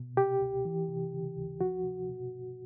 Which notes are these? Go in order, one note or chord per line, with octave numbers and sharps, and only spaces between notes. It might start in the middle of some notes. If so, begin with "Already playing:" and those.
Already playing: B2
C3 G4
C#2
E3
C3
C#3
D2
F3 F#4
C3
B2